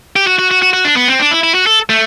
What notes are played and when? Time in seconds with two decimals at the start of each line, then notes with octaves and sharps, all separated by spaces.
0.16 G4
0.27 F#4
0.39 F#4
0.51 F#4
0.62 F#4
0.73 F#4
0.85 D4
0.96 B3
1.08 C4
1.19 D4
1.31 E4
1.43 E4
1.54 F#4
1.67 A4
1.89 A3